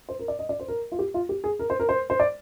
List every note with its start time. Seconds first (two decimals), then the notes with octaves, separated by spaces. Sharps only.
0.09 C5
0.19 A#4
0.28 D5
0.39 D#5
0.49 D5
0.60 C5
0.68 A#4
0.92 F4
0.99 G4
1.14 F4
1.29 G4
1.44 G#4
1.59 A#4
1.70 C5
1.80 A#4
1.89 C5
2.10 C5
2.20 D5